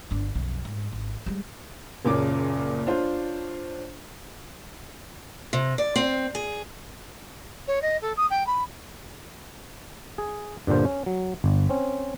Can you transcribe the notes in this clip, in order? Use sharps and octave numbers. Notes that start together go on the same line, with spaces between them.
G1 D4
B1 F2
G#2
G#1
G3 G#3
F#1 A#2 C#3 D6
D4 F4 C5 C#5
C3
D5
C4
G#4
C#5
D#5
A4
D#6
G5
B5
G#4
G2 A#2 D3 C5
C#4
F#3
G1
C4 C#4